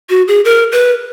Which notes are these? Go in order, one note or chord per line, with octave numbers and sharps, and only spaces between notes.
F#4
G#4
A#4
B4